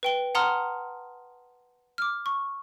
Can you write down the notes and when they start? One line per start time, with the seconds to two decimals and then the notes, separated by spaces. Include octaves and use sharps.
0.03 B4 G5 G7
0.35 F#5 A5 A#5 C6 D#6 F6
1.98 D6 F6
2.26 C#6